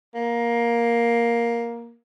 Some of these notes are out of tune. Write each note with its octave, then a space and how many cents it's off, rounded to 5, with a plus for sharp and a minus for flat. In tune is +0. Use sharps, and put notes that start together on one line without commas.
A#3 +10